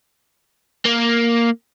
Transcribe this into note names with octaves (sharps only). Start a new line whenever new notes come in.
A#3